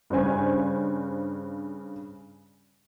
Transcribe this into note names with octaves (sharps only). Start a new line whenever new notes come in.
G2 C#3 C5 G#5